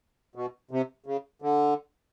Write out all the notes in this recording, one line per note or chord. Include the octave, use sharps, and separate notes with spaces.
B2
C3
C#3
D3